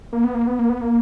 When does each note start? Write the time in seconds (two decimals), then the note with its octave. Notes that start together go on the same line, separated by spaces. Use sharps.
0.13 A#3
0.24 B3
0.35 A#3
0.47 B3
0.59 A#3
0.69 B3
0.81 A#3